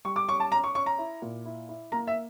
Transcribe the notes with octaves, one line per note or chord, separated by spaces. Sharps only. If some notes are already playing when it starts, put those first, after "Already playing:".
G3 C#6
D6
C#4 C#6
A5
C#4 A#5
C#6
C#4 C#6
A#5
E4
A#2
E4
E4
A#3 A#5
E5